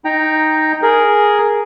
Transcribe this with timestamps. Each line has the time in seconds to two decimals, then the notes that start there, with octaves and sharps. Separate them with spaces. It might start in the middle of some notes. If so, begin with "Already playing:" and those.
0.05 D#4 G5 A#5
0.82 G#4 A#4